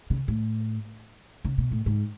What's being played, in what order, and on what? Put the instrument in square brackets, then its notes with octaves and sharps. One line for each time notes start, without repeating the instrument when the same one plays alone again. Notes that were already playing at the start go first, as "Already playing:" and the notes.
[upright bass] C#3
A2
C#3
B2
A2
G#2